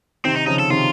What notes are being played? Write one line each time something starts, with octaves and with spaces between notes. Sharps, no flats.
C3 D#3 C4
D#4
C#3 F3 D#4
A4
C3 D#3 F4